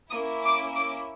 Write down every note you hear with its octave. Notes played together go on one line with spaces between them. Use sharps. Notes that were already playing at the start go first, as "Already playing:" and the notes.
A#3 C#4 E4 D#6
D6
D6